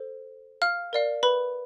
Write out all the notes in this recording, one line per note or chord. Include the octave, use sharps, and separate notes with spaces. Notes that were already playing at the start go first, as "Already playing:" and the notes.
Already playing: A4 C5
F5 F6
A#4 D5 F5
B4 B5